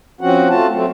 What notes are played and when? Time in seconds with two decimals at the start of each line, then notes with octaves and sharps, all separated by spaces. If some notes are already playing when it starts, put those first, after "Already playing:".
0.21 F3 C4 C#4 F#4 F#5
0.49 A3 F4 F#4 A5
0.72 F#3 A3 C4